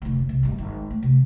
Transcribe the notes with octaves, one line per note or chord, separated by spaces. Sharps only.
F1 D2
C2
D1 G2
G#1
A3
C3